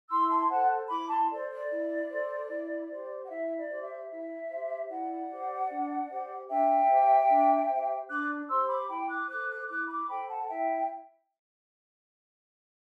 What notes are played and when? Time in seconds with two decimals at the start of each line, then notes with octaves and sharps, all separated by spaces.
0.10 E4 C6 E6
0.29 A5 C6
0.49 A4 C5 F#5 A5
0.89 E4 B5 D6
1.09 A5 C6
1.30 A4 C5 D5
1.50 D5
1.69 E4
2.10 A4 C5
2.49 E4
2.90 G4 C5
3.23 F#5
3.29 E4 E5
3.56 D5
3.69 G4 C5
3.82 E5
4.09 E4 E5
4.49 G4 C5
4.89 E4 D5 F#5
5.28 G4 C5
5.69 D4
6.09 G4 C5
6.48 D4 E5 G5
6.89 G4 C5
7.28 D4
7.68 G4 C5
8.09 D4 D6 F#6
8.48 G4 C5 C6 E6
8.68 B5 D6
8.87 E4 G5 B5
9.07 D6 F#6
9.27 A4 C5 D6 F#6
9.48 D6 F#6
9.68 E4 D6 F#6
9.87 B5 D6
10.08 A4 C5 G5 B5
10.27 F#5 A5
10.47 E4 E5 G5